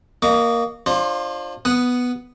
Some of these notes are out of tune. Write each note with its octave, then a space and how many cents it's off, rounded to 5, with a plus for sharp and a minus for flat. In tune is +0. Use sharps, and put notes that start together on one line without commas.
A#3 +5 D#5 -20 C#6 +45
D4 +35 F4 +5 C5 +40
B3 +0 F#5 +0 D#6 +5